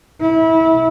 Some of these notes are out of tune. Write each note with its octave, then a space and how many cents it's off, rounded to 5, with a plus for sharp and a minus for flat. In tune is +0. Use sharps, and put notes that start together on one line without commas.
E4 -25